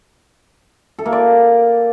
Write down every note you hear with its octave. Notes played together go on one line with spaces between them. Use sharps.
A4
A#3
D5